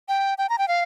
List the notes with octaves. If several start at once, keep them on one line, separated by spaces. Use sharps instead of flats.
G5
G5
A#5
G5
F5